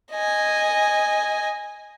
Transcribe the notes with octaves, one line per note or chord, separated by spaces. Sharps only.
D#5 G#5